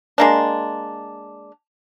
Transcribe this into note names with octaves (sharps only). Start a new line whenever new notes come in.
G#3 A#3 D4